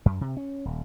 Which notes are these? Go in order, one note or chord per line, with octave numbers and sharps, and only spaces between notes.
F#2
C3
C#4
D#1